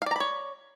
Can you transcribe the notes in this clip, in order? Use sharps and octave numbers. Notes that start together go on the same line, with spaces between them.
C#5 D5 F5 A#5 B5